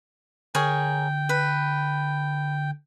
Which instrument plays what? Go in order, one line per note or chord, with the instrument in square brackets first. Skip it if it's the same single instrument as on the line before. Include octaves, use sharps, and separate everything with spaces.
[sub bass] D3 [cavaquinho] G#4 A#4 C#5 [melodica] G5
[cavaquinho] B4